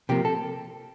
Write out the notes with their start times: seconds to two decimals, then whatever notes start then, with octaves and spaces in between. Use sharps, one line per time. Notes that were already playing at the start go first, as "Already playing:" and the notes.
0.09 C3 F3 A#3 G4
0.25 A4